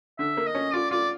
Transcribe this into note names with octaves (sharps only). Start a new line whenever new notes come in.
D3 E5
A#3
D#5
C#4
F4 D5
F4 D5